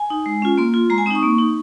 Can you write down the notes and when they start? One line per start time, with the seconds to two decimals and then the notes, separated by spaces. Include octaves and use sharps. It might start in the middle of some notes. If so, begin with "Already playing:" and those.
Already playing: G#5
0.10 D#4
0.26 G#3
0.42 C#4 F4
0.58 A#3 C6
0.74 F4
0.90 G#3 A#5
0.98 G#5
1.06 C4 D#6
1.10 D#4 C#6
1.23 A#3
1.38 D#4